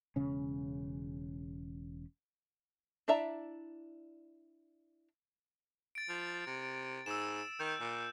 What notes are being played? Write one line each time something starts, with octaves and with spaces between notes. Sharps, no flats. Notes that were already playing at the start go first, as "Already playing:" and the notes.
E1 C#3 C#4
D4 E4 D5 E5 A#5
A6 D7
F3
C3
G#2 E6 E7
D#3 G6
A#2